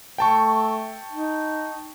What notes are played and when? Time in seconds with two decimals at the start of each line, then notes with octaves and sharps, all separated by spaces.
0.18 A3 G5 A5 C#6
1.12 D#4